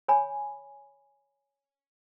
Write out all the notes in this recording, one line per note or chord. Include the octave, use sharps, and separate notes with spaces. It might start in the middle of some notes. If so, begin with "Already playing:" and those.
C#5 G#5 B5